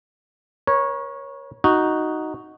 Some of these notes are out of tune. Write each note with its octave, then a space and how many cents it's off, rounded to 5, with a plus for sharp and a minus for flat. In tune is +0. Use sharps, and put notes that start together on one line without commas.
A#4 +45 C#5 -10
D#4 +0 F#4 +0